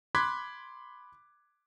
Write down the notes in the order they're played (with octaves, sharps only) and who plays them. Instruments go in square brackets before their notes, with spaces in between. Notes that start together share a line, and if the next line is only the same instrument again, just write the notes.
[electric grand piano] B5 C6 D6 F#6 G#6 B6